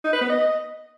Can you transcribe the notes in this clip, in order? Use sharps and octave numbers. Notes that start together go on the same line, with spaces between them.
D#4
B4
B3
D#5